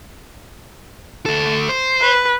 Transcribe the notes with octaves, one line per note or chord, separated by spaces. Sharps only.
D2 A4
C5
B4